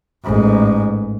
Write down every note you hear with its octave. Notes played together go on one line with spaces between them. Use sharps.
A1 G#2